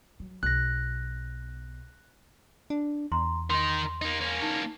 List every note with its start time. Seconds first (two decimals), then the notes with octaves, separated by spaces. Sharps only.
0.20 F#3
0.43 B1 F#6 A#6
2.70 D4
3.12 E2 A#5 C6
3.50 D#3 D#4 C6
4.02 A#3 D#4
4.21 A#3 C#4
4.42 D#4